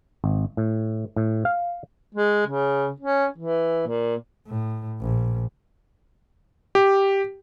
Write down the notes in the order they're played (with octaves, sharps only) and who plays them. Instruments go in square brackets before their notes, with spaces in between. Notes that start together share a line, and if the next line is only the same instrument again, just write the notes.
[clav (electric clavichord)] G#1
A2
A2
F5
[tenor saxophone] G#3
C#3
C#4
E3
A#2
[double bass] A2
A#1
[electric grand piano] G4